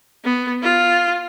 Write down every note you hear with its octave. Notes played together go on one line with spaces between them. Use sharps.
B3
F4